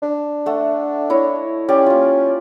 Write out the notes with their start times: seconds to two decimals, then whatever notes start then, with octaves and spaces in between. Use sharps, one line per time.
0.02 D4
0.46 A3 F#5
1.10 E4 C#5 D#5
1.69 C#4 G4 D5 F5
1.86 A#3 F4